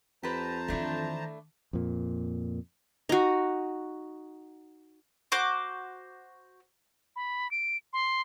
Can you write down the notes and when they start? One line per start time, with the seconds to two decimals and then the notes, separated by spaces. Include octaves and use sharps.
0.23 F2 G4 B4 C5 A5 A#5
0.68 D#3 E3 A3 D4 E4
1.73 F2 A#2
3.09 D#4 F#4
5.32 F#4 C5 D6
7.16 B5
7.51 D7
7.93 C6